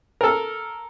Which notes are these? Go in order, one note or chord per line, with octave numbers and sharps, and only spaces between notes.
A4 A#4